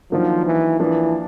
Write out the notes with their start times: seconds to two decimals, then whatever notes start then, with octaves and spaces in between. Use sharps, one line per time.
0.12 D#3 F3 F#3 A#3 D4
0.46 E3
0.80 E3 F3 A#3 D4